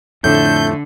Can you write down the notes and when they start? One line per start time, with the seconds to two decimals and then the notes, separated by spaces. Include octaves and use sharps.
0.24 F2 A2 D3 A3 G6